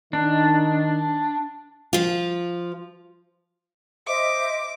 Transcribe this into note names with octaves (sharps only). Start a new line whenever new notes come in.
D#3 D4 D#4
F3 F4
C5 D#5 E5 D6